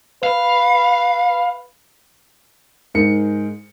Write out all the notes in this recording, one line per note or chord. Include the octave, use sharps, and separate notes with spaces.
B4 F5
G#2 G#3 A#4 C#7